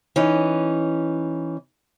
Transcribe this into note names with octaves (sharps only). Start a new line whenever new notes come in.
E3 C#4 D#4